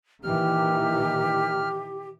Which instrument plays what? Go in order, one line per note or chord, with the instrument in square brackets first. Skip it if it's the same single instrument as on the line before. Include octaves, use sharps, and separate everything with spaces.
[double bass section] A#2 D#3 E3 [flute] G4 [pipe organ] F6